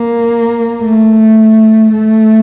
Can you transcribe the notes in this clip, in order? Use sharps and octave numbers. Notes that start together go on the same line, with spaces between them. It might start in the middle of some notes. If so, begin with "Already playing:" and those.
Already playing: A#3
A3
A3